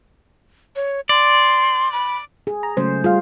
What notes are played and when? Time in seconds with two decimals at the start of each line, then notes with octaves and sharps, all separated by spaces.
0.76 C#5
1.09 D5 C6
1.93 B5
2.47 G#4
2.63 A#5
2.77 C#3 F#3 G#3 A3 C5
3.04 G3 F4 G#4 F5